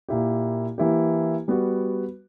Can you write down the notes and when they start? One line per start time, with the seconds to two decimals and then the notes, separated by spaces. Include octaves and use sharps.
0.09 A#2 A#3 E4 G4
0.78 E3 A#3 E4 G4
1.48 G3 B3 F#4